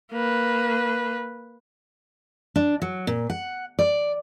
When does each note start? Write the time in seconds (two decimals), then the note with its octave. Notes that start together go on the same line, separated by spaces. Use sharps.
0.12 A#3 B4
2.56 D4
2.82 F#3
3.07 A#2
3.30 F#5
3.79 D5